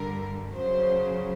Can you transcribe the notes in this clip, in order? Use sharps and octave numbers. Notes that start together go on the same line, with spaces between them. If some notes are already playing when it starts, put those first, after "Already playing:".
Already playing: G2 D3 G3 A#4
F#2 C#3 F#3 C5